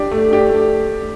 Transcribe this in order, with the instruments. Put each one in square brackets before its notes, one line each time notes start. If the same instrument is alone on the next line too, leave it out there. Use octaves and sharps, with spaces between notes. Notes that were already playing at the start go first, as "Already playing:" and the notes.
Already playing: [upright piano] D4 G4 D5
A3
D4 G4 D5
A3